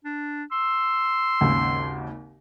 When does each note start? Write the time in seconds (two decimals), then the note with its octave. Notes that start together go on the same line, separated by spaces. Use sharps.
0.04 D4
0.52 C6 E6
1.41 G#1 D#2 C#3